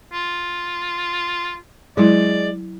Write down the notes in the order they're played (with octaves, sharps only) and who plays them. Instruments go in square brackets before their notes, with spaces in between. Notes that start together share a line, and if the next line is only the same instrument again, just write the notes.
[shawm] F4
[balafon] F#3 E4 [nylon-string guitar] G#3 [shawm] D5